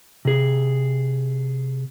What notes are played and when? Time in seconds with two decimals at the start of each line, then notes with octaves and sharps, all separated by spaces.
0.25 C3 G#4